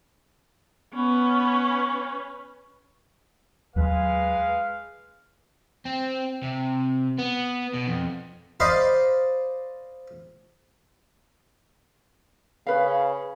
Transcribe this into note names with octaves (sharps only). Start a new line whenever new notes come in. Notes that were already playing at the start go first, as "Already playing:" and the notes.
B3 C#4 B4
D#2 F#3 G#3 B4 F5
C4
C3
B3
B2
F2
C5 D5 D#5 F5 B5
C#3 B4 F5